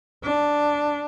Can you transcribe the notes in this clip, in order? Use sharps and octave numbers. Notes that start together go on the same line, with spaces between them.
D4